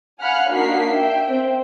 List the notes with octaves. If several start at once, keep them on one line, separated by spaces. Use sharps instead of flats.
F5 F#5 G#5 B5 F6 F#6
A#3 D4 D#4 F#4 B6 C7
E5 G5
C4